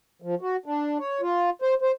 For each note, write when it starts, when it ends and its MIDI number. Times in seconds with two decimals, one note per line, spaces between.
0.22 0.35 53
0.41 0.57 66
0.66 0.98 62
0.99 1.21 73
1.21 1.50 65
1.62 1.74 72
1.82 1.92 72